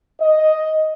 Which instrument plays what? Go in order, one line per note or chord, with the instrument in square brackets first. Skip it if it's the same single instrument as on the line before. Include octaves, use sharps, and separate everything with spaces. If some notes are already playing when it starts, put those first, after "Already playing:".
[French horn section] D#5